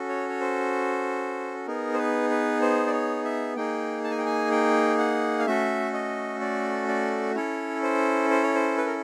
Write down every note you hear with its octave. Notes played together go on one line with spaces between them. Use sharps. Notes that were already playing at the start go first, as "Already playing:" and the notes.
Already playing: C#4 F#4 A4
C#5
C#5
C5
B3 D#4 G#4 A#4
C5
B4
B4
C5
D5
C#5
E5
A#3 D#4 G#4 G5
A5
G#5
G5
G#5
G5
F#5
F5
A3 C#4 F#4 A4 E5
D#5
D5
D5
C#4 E4 A4 C#5
C5
C5
C#5
C5
B4
A#4